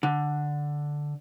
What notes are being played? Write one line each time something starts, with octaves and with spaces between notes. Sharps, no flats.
D3